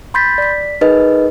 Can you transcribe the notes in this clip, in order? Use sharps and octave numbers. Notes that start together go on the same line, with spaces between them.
B5 C6 G6 A6 B6
D5 B6
D#4 G#4 A#4 B4 D#5